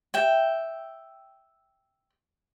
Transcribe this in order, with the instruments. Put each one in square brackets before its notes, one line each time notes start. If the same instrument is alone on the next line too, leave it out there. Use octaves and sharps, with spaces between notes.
[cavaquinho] E5 G5